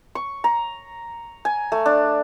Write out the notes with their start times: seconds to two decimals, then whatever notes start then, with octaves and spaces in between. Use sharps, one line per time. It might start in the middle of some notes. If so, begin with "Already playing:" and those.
0.15 C#6
0.44 A#5
1.45 G#5
1.72 A3
1.86 D4